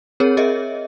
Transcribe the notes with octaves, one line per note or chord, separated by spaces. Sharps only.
C4 G#4 A#4 C#5
G#4 A#4 D#5 E5